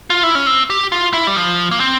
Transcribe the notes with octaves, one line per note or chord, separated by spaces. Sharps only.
F4
E4
C#4
C4
G4
F4
E4
G3
F3
A#3
C4